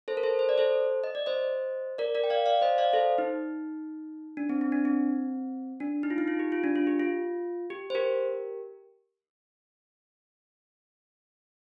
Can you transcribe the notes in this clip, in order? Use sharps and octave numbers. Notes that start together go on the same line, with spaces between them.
A4 C5
A#4
A4 C5
C5
D5
A4 C5
D#5
D5
C5 D#5
A#4 D5
A#4 D5
G5
D5 F5
D5 F5
C5 D#5
D5 F5
A4 C5
D#4
D4
C4
C4
D4
C4
D4
D#4
F4
D#4
F4
G4
F4
D4
F4
G4
F4
G4
C5
G4 A#4